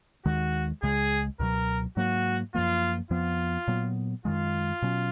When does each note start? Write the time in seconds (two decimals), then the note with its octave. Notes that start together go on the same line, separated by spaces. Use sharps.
0.25 D#2 D#3 G#3 F#4
0.82 C#2 C#3 G#3 G#4
1.40 C#2 B2 F#3 A#4
1.97 G#2 F#3 A#3 F#4
2.55 F#2 F3 A#3 F4
3.10 F2 F3 B3 F4
3.68 A#2 F#3 B3
4.25 F#2 D#3 G#3 F4
4.82 B2 F#3 C#4